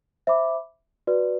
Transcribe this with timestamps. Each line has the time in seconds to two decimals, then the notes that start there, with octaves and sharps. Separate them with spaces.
0.27 C5 E5 B5 D6
1.07 F#4 B4 D5